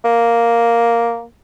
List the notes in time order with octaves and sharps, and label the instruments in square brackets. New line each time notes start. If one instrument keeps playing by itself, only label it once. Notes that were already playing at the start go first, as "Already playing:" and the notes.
[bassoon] A#3